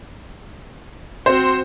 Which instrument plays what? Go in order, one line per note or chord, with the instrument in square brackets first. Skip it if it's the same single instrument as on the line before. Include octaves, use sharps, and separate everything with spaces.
[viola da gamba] C4 F#4 [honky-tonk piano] C5